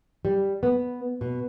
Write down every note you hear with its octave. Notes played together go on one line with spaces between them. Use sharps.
G3
B3
B2